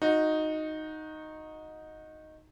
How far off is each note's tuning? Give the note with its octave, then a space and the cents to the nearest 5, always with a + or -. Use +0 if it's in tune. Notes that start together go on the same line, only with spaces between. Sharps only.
D#4 +0 F#4 -25